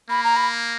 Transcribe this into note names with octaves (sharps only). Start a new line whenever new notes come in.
A#3 B5
A#5
B5